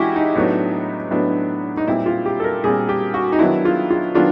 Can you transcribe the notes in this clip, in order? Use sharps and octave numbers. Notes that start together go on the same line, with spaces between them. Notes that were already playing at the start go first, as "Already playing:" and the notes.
Already playing: E3 G#3 C#4 E4 F#4 G4
D#4
A2 F#3 B3 D4
A2 F#3 B3 D4
D#4
A#2 G3 C4 E4
F4
G4
A4
A#4
A#2 G3 C4 G#4
G4
F#4
D#4
D#3 F#3 B3 D4 E4
F4
F4
D#3 F#3 B3 D4 F4